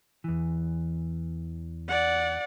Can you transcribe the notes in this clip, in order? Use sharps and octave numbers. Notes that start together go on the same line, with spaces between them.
E2 E3
D5 F#5